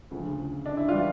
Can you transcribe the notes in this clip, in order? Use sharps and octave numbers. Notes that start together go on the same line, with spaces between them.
D2 C#3 F3
D4
E4
E3 G3 F4